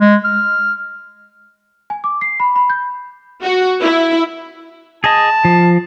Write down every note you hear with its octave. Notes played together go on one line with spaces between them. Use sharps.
G#3
F6
G#5
D6
C7
B5
B5
G6
F#4
E4
G#4 D#5 A5
F3